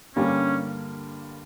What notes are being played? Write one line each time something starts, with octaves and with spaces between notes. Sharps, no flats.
G2 D3 G3 A#3 C#4